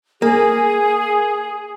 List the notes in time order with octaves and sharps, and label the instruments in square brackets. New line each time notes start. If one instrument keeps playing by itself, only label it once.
[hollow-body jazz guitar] A#3 [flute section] G#4